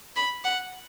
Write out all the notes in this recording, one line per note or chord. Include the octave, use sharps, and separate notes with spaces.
B5
F#5